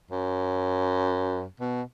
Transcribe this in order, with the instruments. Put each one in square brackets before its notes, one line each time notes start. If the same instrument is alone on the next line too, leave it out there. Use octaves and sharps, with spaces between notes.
[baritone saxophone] F#2
B2